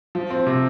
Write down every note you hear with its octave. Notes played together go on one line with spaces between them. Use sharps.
F3
C4
C3